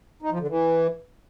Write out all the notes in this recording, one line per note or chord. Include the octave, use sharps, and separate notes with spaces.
D#4
F3
D3
E3